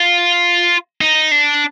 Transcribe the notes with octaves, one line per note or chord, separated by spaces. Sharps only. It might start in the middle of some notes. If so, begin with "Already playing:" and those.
Already playing: F4
D#4
D4